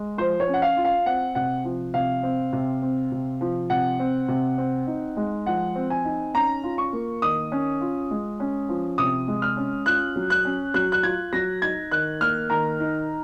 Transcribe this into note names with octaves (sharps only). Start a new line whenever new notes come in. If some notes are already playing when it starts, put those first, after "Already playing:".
Already playing: G#3
F3 C5
C#5
C#4
F#5
F5
F4
F5
C4 F#5
C3 F#5
F3
C3 F5
C4
C3
C4
C3
F3
C3 F#5
C4
C3
C4
D#4
G#3
F3 F#5
C4
G#5
D#4
C#4 A#5
F4
C#6
A#3
D#3 D#6
C#4
F4
G#3
C#4
F3
C3 D#6
G#3
F6
C#4
F4 F#6
F#3
F#6
C#4
F#3 F#6
F#6
F4 G#6
F#3 A#6
D#4 G#6
D#3 F#6
A#3 F6
D#3 A#5
D#4